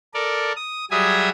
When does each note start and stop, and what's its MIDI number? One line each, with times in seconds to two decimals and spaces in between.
0.14 0.52 69
0.14 0.52 70
0.14 0.52 74
0.56 0.85 87
0.91 1.29 54
0.91 1.29 55
0.91 1.29 68
0.91 1.29 76
0.91 1.29 80
0.91 1.29 87